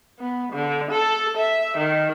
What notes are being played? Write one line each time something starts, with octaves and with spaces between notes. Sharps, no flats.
B3
D3
A4
E5
D#3